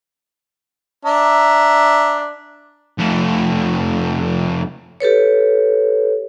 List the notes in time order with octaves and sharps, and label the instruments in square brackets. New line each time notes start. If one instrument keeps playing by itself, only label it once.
[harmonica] D4 E5 A#5
[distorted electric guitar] F2 A3
[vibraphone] G4 A4 B4 C#5